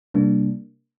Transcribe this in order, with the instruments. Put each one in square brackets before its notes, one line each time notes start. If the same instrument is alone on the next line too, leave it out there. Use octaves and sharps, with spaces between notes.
[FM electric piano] C3 G3 A#3 D4